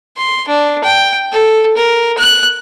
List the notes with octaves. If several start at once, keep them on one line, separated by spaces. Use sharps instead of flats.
C6
D4
G5
A4
A#4
F#6